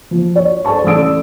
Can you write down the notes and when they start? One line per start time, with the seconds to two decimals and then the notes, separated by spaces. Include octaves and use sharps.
0.11 F3
0.36 C#5
0.65 A4 C5 D5 A5 C#6
0.84 A1 A4 D5 D#6 E6 D7